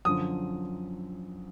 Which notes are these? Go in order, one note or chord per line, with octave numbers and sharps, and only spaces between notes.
F#2 D3 F3 D#6